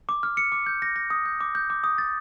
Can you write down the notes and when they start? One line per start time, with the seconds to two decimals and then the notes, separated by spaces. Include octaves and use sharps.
0.09 D6
0.23 F6
0.37 C#7
0.52 D6
0.66 G6
0.82 A#6
0.96 A#6
1.10 D#6
1.26 G6
1.41 D6
1.55 G6
1.70 D6
1.84 D#6
1.98 A6